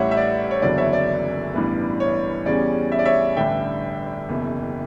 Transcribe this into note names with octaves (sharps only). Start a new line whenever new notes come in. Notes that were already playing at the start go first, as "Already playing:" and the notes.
Already playing: A1 A2 G3 C#5 E5 F#5
E5
D5
C#5
F#1 E2 D3 F#3 D5
C#5 E5
D5
A1 G2 E3 B3
C#5
E2 C#3 G3 C#4 D5
E5
D5
C#5 E5
A1 G2 D3 E5 G5
F#1 E2 B2